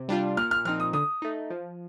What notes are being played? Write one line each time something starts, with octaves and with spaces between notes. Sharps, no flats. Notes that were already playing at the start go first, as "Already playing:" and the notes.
Already playing: C3
G3 D4 F4
A#2 F6
F6
F3 C4 D#4 F6
D#6
D3 D#6
A3 D#4
F3